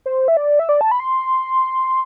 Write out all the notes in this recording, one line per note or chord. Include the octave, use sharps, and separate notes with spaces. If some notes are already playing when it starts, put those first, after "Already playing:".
C5
E5
D5
E5
D5
A5
B5
C6